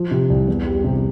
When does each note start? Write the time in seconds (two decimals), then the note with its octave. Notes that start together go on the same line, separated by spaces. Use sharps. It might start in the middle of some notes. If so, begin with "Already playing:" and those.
Already playing: F3
0.11 C3
0.30 C2
0.48 E2
0.66 G3
0.84 C3